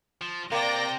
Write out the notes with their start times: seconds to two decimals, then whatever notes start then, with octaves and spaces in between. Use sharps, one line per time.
0.21 F3
0.52 C3 A#3 D5 G5 A#6